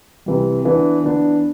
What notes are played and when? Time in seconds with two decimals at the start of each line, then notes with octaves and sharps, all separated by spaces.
0.26 C3 E3 G3
0.65 E3 B3 D4
1.04 E3 B3 D4